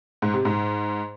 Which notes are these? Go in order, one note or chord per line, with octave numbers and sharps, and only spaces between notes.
G#2
C3
G#2